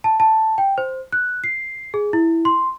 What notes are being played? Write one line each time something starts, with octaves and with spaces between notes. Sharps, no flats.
A5
A5
G5
C5
F#6
C7
G#4
E4
C6